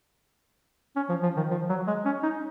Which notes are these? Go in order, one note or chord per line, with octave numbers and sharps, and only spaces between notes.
C#4
F3
F3
D#3
F3
F#3
G#3
C#4
D#4